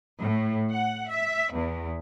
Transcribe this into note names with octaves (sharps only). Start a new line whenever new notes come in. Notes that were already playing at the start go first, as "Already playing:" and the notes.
A2
F#5
E5
E2